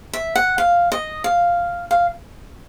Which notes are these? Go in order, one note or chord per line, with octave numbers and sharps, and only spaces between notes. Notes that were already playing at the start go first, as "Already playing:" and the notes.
E5
F#5
F5
D#5
F5
F5